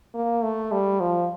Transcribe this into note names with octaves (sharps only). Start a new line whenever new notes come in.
A#3
A3
G3
F3